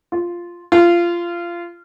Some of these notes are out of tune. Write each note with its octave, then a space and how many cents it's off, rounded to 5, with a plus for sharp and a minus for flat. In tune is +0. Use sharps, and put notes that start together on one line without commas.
F4 -5
F4 -20